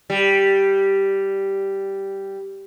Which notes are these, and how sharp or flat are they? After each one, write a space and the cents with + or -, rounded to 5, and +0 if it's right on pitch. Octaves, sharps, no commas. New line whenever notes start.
G3 -5